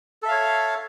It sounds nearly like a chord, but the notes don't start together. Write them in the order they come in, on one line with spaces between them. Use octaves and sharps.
A4 E5 F5 C#5